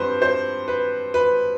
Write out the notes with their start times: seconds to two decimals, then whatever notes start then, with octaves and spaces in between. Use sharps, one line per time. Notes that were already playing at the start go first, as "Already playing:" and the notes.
Already playing: G2 F3 C4 B4 C5
0.22 C5
0.68 B4
1.14 B4